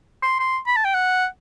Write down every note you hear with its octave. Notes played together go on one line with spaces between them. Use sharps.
C6
C6
B5
A5
G5
F#5